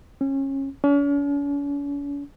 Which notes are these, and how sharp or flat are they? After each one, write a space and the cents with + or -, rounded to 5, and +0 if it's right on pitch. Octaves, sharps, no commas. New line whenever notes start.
C#4 -25
C#4 +45